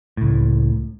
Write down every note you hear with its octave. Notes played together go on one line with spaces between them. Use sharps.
C#2 A2